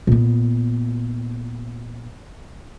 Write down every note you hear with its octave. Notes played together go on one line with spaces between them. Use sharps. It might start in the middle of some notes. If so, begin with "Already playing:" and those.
A#2 B3